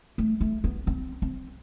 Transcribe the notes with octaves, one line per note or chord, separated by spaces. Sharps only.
A3
A3
B3
C4
C4